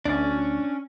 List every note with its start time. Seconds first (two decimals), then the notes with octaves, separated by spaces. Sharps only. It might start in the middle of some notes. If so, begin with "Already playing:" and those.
0.05 D2 C#4 D4